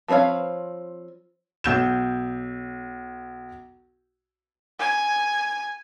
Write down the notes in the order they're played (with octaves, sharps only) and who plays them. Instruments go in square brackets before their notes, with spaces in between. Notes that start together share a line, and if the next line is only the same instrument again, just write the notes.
[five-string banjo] F3 C4 B4 C#5 F5
[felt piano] B1 G6 E7
[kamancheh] G#5